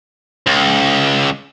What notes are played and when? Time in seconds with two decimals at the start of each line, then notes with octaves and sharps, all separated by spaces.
0.47 C#2